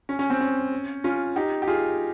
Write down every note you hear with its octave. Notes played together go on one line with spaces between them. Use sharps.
C#4
C#4
C4
C#4
C#4 F4
D#4 G4
G4
F4 G#4